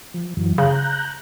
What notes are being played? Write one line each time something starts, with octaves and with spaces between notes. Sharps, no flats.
F3
F#2 E3 F#3
C#3 A#5 F#6 G6